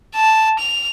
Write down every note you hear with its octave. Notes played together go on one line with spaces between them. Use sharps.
A5
F7